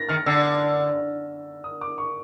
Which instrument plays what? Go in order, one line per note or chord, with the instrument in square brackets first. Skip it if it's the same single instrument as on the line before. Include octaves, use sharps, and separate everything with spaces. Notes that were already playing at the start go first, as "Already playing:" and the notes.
Already playing: [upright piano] A6 A#6
[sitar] D#3 [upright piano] F6
[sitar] D3 [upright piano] E6
[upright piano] D#6
D6
C#6